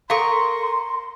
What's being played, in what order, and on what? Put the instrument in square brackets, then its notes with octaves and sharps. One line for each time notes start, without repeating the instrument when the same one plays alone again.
[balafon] A4 F5 [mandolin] A#4 C#6 [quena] C6